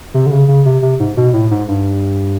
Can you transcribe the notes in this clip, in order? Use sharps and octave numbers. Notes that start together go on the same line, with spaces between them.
C3
D3
C#3
C#3
C3
C3
G#2
B2
A2
G#2
G2